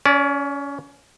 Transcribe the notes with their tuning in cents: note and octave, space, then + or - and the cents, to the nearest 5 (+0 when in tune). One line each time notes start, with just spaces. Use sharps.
C#4 +20 D5 -20